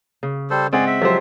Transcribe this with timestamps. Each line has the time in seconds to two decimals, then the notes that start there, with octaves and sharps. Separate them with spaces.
0.23 C#3
0.50 G3 A4 C5
0.73 G#3 C4 G#4 D5 F#5
0.87 E5
1.01 F3 F#3 G4 C5